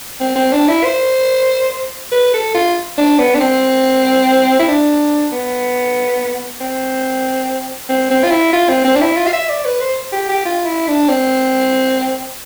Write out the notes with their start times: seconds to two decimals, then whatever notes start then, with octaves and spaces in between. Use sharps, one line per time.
0.20 C4
0.36 C4
0.53 D4
0.68 E4
0.84 C5
2.12 B4
2.34 A4
2.55 F4
2.98 D4
3.19 B3
3.35 D4
3.40 C4
4.59 E4
4.68 D4
5.32 B3
6.61 C4
7.89 C4
8.10 C4
8.24 F4
8.31 E4
8.53 F4
8.69 C4
8.85 C4
8.96 D4
9.01 E4
9.17 F4
9.27 F5
9.33 E5
9.49 D5
9.65 B4
9.81 C5
10.13 G4
10.29 G4
10.45 F4
10.66 E4
10.87 D4
11.09 C4